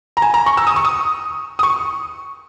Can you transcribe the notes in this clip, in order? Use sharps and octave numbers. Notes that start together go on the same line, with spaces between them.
A#5
G#5
A#5
C#6
E6
D#6
C#6
D#6
D#6
C#6